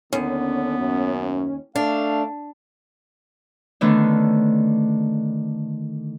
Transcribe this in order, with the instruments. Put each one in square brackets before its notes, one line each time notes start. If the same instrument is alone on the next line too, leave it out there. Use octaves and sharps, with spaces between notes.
[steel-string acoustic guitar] D#2 [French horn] D3 [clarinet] B3 [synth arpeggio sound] C#4
[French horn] F#2
[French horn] A3 [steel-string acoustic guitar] D4 [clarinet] F5
[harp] D3 D#3 A3 B3 C#4 D4